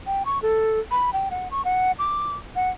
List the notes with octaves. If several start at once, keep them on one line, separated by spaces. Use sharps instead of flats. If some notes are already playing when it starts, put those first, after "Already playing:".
G5
C#6
A4
B5
G5
F#5
C#6
F#5
D6
F#5